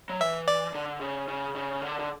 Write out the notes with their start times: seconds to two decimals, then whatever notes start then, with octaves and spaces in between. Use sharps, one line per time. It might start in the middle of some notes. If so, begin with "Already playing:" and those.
0.09 F#3
0.20 E3 E5
0.48 D5
0.75 D3
1.01 C#3
1.28 C#3
1.55 C#3
1.82 D3
1.99 D3